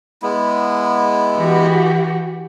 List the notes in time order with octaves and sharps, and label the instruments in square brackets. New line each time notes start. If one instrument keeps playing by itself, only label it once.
[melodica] G#3 B3 E4
[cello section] E3 F#4 G4